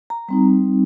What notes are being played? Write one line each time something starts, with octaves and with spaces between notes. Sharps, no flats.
A#5
G3 C4 D#4 A#5